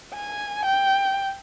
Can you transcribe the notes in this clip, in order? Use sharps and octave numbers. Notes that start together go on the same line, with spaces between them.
G#5
G5